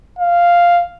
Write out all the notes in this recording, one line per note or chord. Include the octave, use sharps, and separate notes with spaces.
F5